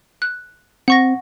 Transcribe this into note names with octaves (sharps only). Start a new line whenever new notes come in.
F#6
C4 F#5 C#6 A#6